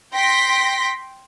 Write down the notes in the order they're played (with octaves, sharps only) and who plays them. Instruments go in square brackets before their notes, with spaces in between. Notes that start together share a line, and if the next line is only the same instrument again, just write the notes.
[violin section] G5 C6 A#6 B6